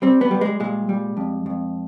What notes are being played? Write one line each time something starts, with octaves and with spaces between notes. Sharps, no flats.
G3 C4
B3
G3
G#3
A#2 G#3
G3
F2
F2